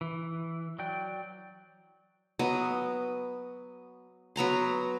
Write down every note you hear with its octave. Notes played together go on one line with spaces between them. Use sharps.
E3
F#3 D5 G5
F#3 B3 D#5
F#3 B3 A#5 C6